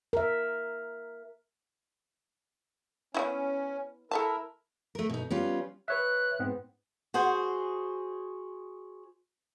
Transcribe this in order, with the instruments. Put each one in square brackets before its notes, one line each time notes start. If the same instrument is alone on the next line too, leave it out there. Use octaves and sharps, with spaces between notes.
[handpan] A#4 E5
[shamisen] B3 D#4 E4 [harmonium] C#4
[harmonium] E4 A#4 [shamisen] A4 E5 A5
[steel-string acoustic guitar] A3 A#4
B2 D#4
G3 B3 C#4 F4
[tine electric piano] B4 C#5 E5 [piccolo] F#6
[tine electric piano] G#2 B3 C4
[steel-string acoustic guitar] F#4 G#4 C5